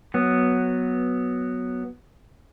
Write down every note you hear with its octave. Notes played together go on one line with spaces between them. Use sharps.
F#3 B3